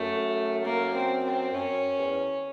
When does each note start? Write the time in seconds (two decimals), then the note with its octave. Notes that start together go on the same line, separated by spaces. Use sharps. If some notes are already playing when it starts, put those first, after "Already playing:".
Already playing: F#2 A3
0.65 A#3
0.94 C4
1.24 C4
1.53 F#2 C#4
1.99 E2